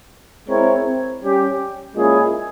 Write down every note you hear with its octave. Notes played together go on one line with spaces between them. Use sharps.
G#3 C4 E4 A#4 C#5
G3 C#4 G4
A#2 G#3 C#4 E4 G#4